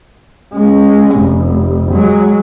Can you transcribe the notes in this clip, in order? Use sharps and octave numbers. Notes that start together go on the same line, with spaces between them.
G#3 C#4
F1
F#3 G#3